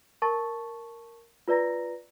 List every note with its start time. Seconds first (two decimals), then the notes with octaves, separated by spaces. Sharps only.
0.22 A#4 A5 C#6 A6
1.48 F4 B4 D5 A#5 A#6